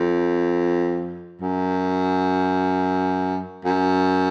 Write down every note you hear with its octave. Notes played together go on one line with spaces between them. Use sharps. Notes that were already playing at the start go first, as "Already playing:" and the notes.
Already playing: F2
F#2
F#2